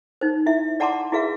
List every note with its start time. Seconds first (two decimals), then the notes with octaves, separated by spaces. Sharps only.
0.21 D#4 C5
0.46 E4 E5
0.80 D5 F#5 A5 A#5 C6 D6
1.12 E4 F#4 G#4 B4 E5 F5